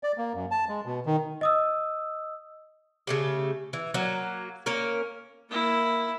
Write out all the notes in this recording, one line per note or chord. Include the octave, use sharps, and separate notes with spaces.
D5
A#3
F#2
A5
G#3
B2
D#3
D#5 D#6 E6
C#3 A3 G4
E3
F#3 A#3
A#3 C#4 A#4
A#3 E4